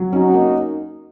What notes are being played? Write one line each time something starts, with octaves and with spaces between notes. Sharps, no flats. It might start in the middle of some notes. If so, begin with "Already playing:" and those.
Already playing: F#3
C#4 D#4 F#4
A#3